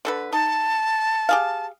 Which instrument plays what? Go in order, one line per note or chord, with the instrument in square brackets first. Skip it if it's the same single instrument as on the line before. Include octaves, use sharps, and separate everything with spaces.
[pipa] D3 A4 B4
[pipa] D#4 [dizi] A5
[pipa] G4 G#4 F5